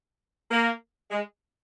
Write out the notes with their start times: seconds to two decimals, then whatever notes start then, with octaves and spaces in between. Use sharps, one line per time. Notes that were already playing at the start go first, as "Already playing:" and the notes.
0.51 A#3
1.11 G#3